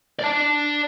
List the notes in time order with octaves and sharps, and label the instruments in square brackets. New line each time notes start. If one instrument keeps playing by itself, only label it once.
[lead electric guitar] D5 A5